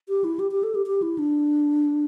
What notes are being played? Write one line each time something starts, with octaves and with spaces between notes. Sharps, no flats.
G4
E4
G4
G4
A4
G4
G4
E4
D4